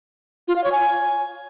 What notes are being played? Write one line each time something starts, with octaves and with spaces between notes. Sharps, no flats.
F4
F5
C#5
G#5